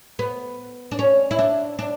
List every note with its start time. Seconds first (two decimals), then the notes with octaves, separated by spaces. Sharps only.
0.19 B3
0.91 D4
0.99 C#4
1.31 E4
1.39 D4
1.79 D4